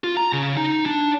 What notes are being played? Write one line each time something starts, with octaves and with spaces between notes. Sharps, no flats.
F4
A#5
C#3
D#4
D4